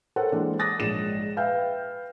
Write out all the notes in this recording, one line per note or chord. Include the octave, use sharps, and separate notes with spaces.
A4 A#4 C5 C#5 F#5 G5
E3 G#3 A#3 D4
D6 D#6 F#6 A6 A#6
A#1 G#2 C#5 E7
B4 E5 F5 G5 F6 G6